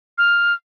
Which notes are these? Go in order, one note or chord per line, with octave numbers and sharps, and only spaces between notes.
F6